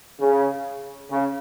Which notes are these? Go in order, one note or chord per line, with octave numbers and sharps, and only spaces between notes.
C#3
C#3